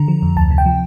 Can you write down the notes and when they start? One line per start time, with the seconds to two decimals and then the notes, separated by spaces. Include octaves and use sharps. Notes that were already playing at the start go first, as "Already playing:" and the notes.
Already playing: D3 A#5
0.08 F3
0.22 F2
0.36 D2 A5
0.51 C3
0.58 G5
0.66 F3